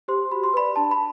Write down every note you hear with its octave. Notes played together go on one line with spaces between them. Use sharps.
G4 C5 C6
F#4 B5
C6
B4 D5 B5
D4 A5
B5